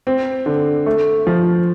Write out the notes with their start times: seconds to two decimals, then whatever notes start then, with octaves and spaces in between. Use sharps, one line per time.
0.07 C4
0.46 D3
0.86 A3
1.27 F3